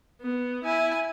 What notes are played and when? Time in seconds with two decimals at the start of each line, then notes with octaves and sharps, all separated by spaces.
0.22 B3
0.65 E4 G#5